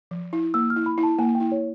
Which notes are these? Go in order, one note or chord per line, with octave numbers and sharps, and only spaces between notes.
F3
E4
A#3 E6
F6
E4
B5
E4
A5
A#3 G#5
G5
E4
C#5